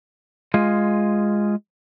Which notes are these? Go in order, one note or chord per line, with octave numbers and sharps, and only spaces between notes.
G#3 F4 G#4